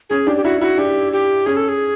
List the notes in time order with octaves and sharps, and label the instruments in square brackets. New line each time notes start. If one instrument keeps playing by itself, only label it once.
[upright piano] C#4 [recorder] G#4
[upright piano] D4 [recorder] G4
[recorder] G4
[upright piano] E4 [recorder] F#4
[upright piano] E4 [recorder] F#4
[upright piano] D4 [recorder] G4
[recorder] G4
[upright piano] C#4 [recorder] G#4
[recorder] A4
G#4